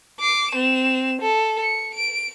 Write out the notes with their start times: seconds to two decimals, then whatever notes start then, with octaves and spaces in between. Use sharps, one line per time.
0.20 D6 C7
0.51 C4 E7
1.22 A4
1.62 C#7
1.94 D7